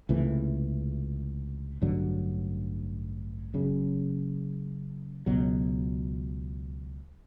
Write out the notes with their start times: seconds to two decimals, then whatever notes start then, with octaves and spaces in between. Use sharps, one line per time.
0.09 C#2 C3 E3 A3
1.82 A1 G2 D3 F#3
3.54 F#1 F#2 C#3
5.26 C#2 B2 F#3